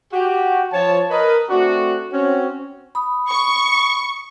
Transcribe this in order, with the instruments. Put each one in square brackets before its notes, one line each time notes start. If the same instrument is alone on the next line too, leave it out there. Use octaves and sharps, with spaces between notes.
[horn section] F#4 G4
F3 C#5 A5
A#4 B4 D#5
A3 C4 D4 F#4
C4 C#4 F#4
[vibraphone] B5 D#6
[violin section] C#6